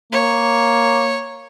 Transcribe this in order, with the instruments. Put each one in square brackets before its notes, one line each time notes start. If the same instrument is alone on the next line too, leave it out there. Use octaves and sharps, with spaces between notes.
[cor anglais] A#3 [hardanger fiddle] C#5